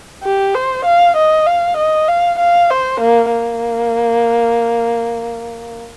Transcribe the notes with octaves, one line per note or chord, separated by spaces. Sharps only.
G4
C5
F5
D#5
F5
D#5
F5
F5
C5
A#3
A#3